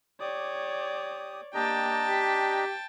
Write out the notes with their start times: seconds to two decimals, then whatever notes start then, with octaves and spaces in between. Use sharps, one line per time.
0.20 G4 C#5 D5 D#6
1.54 A#3 D4 G4 D#5 G5 A5 A#5
2.09 G4 B6